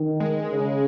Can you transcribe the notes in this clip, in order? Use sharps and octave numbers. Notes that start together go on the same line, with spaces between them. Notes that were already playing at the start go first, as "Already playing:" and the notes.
Already playing: D#3
G#3
C#3